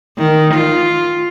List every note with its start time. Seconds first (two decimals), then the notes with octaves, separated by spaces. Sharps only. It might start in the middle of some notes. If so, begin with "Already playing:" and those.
0.18 D#3
0.54 F4